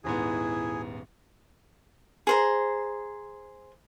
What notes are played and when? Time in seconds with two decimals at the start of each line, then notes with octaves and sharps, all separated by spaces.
0.04 D#1 G#2 B3 E4 G#4
2.27 G#4 C5 A#5